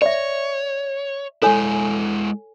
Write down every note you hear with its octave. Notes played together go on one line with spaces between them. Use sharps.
C#5 D5 E5
G#3 E4 A4 C#5 G#5